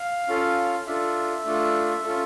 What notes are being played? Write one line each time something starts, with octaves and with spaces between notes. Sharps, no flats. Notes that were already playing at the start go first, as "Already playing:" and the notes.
Already playing: F5
C#4 F4 A4
D4 F4 A4 E5
A3 D4 F4 A4
C#4 F4 A4